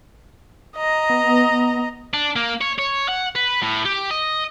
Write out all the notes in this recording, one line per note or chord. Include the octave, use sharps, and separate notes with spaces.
D#5 A#5
B3
D4
A#3
C#5
C#5
F#5
B4
A2
G4
D#5